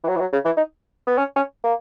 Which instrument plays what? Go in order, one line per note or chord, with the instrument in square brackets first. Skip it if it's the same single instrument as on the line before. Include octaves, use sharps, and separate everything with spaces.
[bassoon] E3
F#3
E3
F#3
C#3
E3
D#4
B3
C#4
C#4
A#3